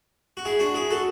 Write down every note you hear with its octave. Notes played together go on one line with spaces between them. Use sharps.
F#4
E4 G#4
D4 F#4
E4 G#4
F#4 A4